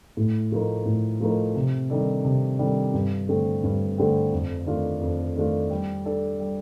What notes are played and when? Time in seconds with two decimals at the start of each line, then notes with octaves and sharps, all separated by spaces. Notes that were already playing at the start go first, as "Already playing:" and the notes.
0.17 A2
0.52 F3 A3 D#4 A#4
0.86 A2
1.20 F3 A3 D#4 A#4
1.56 C3
1.90 D#3 G3 D4 A4
2.25 C3
2.59 D#3 G3 D4 A4
2.94 G2
3.29 D3 A3 C4
3.64 G2
3.98 D3 A3 C4
4.32 F2
4.66 D#3 A3 D4 F4
5.01 F2
5.36 D#3 A3 D4 F4
5.70 G3
6.06 D4 A4
6.40 G3